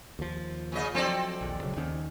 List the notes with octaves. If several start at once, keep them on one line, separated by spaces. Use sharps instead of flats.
D#2 F3
A#2 C#3 D#5
F3 F#3 C4 A4 D5
A#1 D#2
E1 C#3 F#3
D#2 D#3 C#4